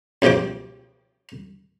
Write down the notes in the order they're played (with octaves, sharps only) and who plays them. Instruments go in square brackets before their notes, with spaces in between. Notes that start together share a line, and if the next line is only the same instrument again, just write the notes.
[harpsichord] C#2 B2 F3 G4 D6